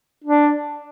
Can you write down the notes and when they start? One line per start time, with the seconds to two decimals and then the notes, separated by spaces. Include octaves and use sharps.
0.24 D4